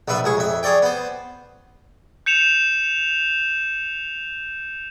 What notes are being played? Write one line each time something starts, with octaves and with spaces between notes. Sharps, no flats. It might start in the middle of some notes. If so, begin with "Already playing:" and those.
A#1 F3 B4 E5
C#2 G#4 C#6
F2 E5
G#4 C#5 D5 G5
B3 C5
G6 C#7 E7 F7